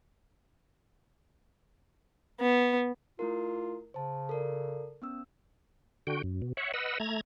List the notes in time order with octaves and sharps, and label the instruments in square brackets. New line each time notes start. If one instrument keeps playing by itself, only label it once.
[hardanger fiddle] B3
[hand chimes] A3 E4 A#4 [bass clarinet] F4
[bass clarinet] C#3 [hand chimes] C5 A5
[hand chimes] A4 A#4 D5
B3 C#4 E6
[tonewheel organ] D3 F#4 G5
F#2
B2
C#5 E5 F#5
B4 D#5 F#5 E6
A3 A#5 G#6